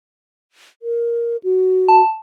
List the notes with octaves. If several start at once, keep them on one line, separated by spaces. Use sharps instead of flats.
A#4
F#4
A5